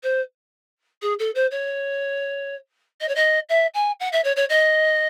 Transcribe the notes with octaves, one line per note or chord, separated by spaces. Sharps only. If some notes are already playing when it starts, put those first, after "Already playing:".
C5
G#4
A4
C5
C#5
D#5
C#5
D#5
E5
G#5
F#5
E5
C#5
C#5
D#5